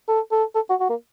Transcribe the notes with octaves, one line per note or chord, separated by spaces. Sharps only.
A4
A4
A4
F#4
F#4
A#3